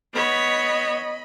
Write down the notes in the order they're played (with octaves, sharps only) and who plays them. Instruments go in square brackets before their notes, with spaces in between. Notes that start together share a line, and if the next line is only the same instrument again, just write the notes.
[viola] B3 C#5 [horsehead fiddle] D#5 B5